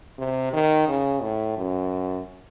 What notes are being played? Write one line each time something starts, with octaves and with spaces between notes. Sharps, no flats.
C3
D#3
C#3
A2
F#2